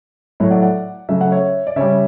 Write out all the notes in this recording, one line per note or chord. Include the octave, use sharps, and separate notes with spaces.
A2 F#3 A3 C#5 E5
D5 F#5
D5 F#5
C#3 F#3 A3 E5
F#5
C#5 E5
D5
C#3 G3 C#5 E5